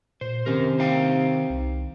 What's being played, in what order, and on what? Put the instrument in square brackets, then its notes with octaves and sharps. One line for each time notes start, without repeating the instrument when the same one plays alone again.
[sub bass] A#2 [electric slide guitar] C5
[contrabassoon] C3 [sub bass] D#3 [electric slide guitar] C#4 A#4
[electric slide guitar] D#4 F5 G5
[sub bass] C2